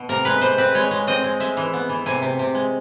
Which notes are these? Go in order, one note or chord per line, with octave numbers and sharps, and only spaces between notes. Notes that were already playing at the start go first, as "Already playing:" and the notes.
Already playing: B2
C3 A#4
G#3 B4
C3 C5
C4 B4
G#3 C#5
G#3
C4 D#5
G#3
G#3 E5
E3
B3
E3
C3 G#5
C3
C3
G#3